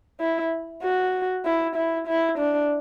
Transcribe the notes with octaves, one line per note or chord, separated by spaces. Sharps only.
E4
F#4
E4
E4
E4
D4